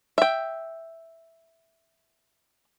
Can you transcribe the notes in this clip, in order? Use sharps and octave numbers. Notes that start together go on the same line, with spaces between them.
E5 G5